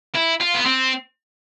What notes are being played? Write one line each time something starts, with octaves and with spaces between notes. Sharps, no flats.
E4
F4
B3
C4